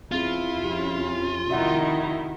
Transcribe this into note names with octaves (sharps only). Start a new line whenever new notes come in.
E2 C4 E4 F4 G#4
F2 C#4 G4
F1 D#3 D#4 E4 F#4 E5 F#5